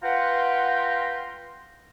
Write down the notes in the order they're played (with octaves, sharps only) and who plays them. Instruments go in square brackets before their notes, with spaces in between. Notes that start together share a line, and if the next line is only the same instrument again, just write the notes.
[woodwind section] F4 B4 F#5 G5 A#5 C6